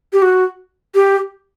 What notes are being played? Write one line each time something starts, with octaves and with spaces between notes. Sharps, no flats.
G4
F#4
G4